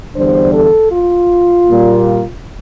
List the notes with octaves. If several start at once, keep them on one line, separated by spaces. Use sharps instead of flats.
E2 D3 G3 D4 C5
A4
F4
A#2 G3 A#3